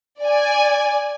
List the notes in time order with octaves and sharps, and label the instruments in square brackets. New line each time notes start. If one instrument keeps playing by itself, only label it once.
[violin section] D5 G#5